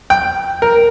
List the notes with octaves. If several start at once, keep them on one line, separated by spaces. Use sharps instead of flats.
G5
A#4